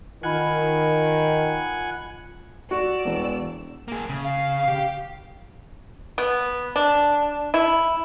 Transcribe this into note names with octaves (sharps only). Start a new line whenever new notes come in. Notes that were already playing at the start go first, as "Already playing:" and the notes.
D#3 F4 F#5 G#5 B5
F#4 D5 E6
E1
A#3 G#4
C#3
F5
G4
B3
D4
E4